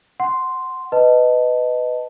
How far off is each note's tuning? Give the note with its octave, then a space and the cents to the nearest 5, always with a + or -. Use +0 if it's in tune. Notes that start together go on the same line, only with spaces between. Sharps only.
F#5 +0 C6 +0
B4 +15 D#5 +0 A5 +5